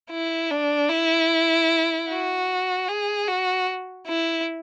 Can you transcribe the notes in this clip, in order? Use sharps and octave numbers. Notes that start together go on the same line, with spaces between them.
E4
D4
E4
F#4
G#4
F#4
E4